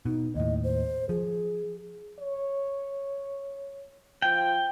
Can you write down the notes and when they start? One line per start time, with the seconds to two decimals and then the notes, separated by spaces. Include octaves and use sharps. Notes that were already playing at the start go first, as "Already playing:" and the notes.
0.05 B2 D#4
0.35 D#2 A2 D#5
0.64 C5
1.09 F3 G#4
2.19 C#5
4.22 F3 G5